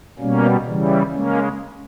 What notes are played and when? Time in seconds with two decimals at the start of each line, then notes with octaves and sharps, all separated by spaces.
0.19 B2 G3 A#3 C#4
0.65 C#3 E3 G3
1.11 C#3 G#3 A#3 C#4